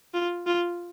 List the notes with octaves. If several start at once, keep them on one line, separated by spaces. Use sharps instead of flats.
F4
F4